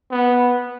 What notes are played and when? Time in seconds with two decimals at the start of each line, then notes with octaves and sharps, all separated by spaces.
0.11 B3